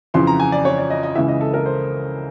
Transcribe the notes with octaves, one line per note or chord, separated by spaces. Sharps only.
F2 C#3 E3 C6
A#5
G#5
D5
C#5
D5
D#5
D#5
C#2 C#3 E3 E5
D#5
A4
A#4
C5